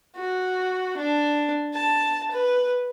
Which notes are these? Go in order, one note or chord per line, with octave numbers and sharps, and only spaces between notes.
F#4
D4
A5
B4